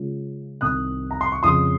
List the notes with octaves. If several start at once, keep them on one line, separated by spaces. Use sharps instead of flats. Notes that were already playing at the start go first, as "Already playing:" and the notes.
Already playing: C#3 G#3 C#4 F4
C2 C3 D#3 D#6 F#6
A#5
C6
C#6
F2 C#3 F3 C6 D#6